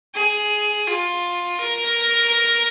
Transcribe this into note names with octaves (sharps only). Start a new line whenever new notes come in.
G#4
F4
A#4